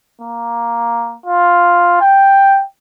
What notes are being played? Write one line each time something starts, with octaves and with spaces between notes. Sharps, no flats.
A#3
F4
G5